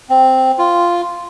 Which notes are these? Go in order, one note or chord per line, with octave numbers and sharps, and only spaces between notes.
C4
F4